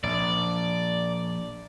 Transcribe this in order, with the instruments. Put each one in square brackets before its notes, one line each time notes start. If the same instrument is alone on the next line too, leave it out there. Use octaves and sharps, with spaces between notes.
[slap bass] A#1 [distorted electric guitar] D5